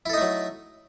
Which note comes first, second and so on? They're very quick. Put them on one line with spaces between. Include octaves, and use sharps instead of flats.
E4 A4 D#4 A3 F#3